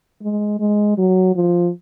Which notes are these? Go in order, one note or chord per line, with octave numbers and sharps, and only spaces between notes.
G#3
G#3
F#3
F3